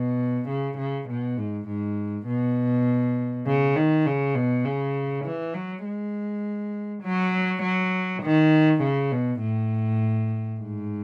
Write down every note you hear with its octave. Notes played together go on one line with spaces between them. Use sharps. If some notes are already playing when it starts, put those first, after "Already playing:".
Already playing: B2
C#3
C#3
B2
G#2
G#2
B2
C#3
D#3
C#3
B2
C#3
E3
F#3
G#3
F#3
F#3
D#3
C#3
B2
A2
G#2